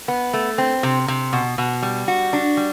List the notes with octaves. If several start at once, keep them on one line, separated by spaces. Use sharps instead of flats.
B3
A3
C4
C3
C3
B2
B2
G3
F#4
D4
G3